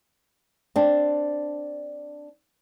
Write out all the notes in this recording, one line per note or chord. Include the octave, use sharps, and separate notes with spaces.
C4 D4